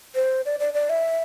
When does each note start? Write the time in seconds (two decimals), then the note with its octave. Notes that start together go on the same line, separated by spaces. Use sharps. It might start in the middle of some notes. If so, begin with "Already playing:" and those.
0.15 C5
0.46 D5
0.60 D5
0.74 D5
0.90 E5